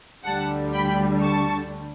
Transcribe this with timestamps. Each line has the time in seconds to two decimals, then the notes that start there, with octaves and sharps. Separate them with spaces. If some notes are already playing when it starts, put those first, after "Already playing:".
0.25 D2 D3 G3 F#5 A5
0.72 G5 B5
1.21 A5 C#6